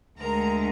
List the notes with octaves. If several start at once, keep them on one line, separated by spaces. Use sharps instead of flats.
D2 D3 G#3 A#4 A#5